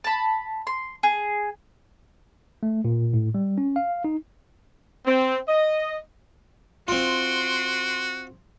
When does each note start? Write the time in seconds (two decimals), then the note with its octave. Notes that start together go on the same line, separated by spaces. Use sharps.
0.04 A5 B5
0.67 C6
1.03 G#4
2.63 A3
2.85 A#2
3.13 A2
3.35 G3
3.58 C#4
3.76 F5
4.04 D#4
5.06 C4
5.48 D#5
6.88 C4 F4 F#4 C6 D7